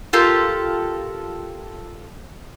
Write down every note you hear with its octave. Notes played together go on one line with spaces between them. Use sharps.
F4 G4 A4 A#4